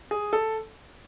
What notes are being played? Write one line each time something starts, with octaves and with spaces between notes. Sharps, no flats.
G#4
A4